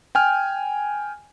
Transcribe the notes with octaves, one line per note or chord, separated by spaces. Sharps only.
G5 G#5 F6